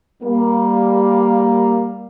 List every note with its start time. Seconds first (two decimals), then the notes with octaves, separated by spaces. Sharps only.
0.22 G3 A#3